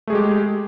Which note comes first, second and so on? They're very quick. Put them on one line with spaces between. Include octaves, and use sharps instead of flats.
A3 G#4 G#3 G4